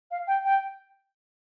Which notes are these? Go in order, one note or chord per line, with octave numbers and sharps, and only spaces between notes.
F5
G5
G5